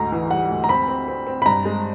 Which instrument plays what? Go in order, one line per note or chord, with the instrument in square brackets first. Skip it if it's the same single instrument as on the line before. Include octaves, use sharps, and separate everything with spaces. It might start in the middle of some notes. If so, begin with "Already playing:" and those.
Already playing: [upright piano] D2 G#2 [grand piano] A#5
[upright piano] E3
[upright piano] G3 [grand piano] F#5
[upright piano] D2
[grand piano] A#5
[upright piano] C4 [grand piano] B5
[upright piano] C4
C4
C4
[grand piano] B5
[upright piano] G2 [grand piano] A#5
[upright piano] G#3